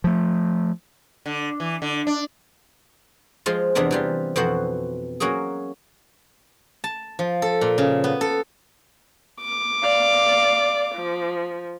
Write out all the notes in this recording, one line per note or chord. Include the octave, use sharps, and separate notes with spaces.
F3 A3
D3
E3
D3
D4
F3 G#3 F4
E2 C3 G#3 B3 D4 A#4
E3 G3 F4
F2 B2 E3 F#4 C5 F#5
F#3 A#3 C#4 F#4 G#4
A5
F3
A4
A#2
C#3
B3
A4
D6
D5 F5
F3